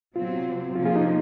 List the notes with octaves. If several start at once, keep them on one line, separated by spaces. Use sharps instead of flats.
C3 F#3 C4 F4
C3 F3 A#3 C#4 F4
F4 G#4
D#4